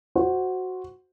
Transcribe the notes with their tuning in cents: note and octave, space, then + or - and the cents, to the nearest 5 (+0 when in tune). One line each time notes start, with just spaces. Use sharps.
F#4 +0 C5 +0